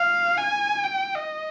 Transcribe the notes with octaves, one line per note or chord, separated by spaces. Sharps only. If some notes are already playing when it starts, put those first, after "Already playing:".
Already playing: F5
G#5
G5
D#5